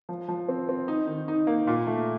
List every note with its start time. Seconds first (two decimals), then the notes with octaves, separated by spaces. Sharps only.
0.09 F3
0.28 F3
0.48 C4
0.69 C4
0.88 D#4
1.07 D#3
1.28 D#4
1.47 A#3
1.67 A#2
1.87 A3